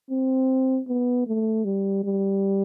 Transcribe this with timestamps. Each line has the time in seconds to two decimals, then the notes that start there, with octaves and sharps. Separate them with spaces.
0.11 C4
0.88 B3
1.27 A3
1.65 G3
2.04 G3